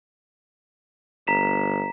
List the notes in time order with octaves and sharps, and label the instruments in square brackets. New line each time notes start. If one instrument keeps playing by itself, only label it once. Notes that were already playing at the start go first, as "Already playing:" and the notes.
[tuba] G1 [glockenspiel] A#5 B6 E7